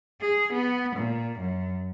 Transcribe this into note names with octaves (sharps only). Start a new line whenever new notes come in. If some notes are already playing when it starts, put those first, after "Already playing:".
G#4
B3
A#2
F#2